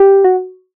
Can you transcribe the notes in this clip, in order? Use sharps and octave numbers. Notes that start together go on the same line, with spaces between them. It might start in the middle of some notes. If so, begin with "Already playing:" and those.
Already playing: G4
F#4